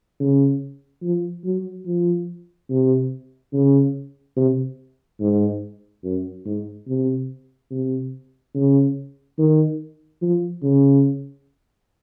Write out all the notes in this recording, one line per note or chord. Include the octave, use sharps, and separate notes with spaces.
C#3
F3
F#3
F3
C3
C#3
C3
G#2
F#2
G#2
C3
C3
C#3
D#3
F3
C#3